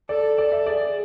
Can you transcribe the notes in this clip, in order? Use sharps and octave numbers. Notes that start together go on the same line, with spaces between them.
A4 D5
A4 D5
E5
G#4 D5